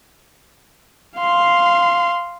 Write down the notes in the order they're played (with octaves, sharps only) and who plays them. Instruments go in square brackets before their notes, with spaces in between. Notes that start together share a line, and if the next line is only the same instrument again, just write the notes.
[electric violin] F5 C6